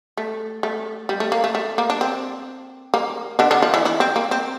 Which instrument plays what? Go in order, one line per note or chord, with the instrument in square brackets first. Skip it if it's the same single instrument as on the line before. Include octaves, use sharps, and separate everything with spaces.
[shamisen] A3
A3
G3
A3
A#3
A3
A3
A#3
D4
C4
A#3
D3 D4
D3 D4
F3 F4
E3 E4
E3 E4
C4
A#3
C4